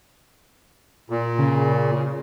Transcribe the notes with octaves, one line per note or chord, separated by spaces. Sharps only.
A#2
C#3